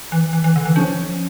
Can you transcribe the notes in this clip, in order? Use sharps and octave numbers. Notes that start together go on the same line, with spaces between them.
E3
E3
E3
D3
E3
F3 C#4